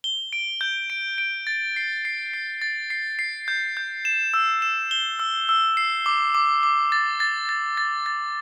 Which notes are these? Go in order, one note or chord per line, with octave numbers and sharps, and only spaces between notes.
G7
D7
G6
D7
D7
A6
C7
C7
C7
A6
C7
C7
G6
G6
E7
E6
E7
G7
E6
E6
C7
D6
D6
D6
A6
A6
A6
A6
A6